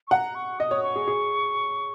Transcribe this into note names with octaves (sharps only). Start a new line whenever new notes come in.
C#6
F#5 A#5
C#6
D#5 D#6
C#5
C#6
G#4
G#4